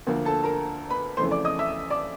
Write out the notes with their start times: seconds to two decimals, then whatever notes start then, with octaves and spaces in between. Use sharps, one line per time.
0.07 D2 D3 F3 A#3
0.25 A4 A5
0.43 A#4 A#5
0.90 B4 B5
1.17 F2 C#3 E3 A3 C5 C6
1.31 D5 D6
1.45 D#5 D#6
1.59 E5 E6
1.90 D5 D6